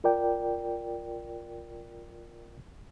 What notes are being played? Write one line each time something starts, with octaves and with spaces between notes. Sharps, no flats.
F4 A#4 D5 G5